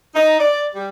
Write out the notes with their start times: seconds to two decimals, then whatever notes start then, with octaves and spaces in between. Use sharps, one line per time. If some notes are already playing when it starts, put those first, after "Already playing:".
0.15 D#4
0.40 D5
0.75 G3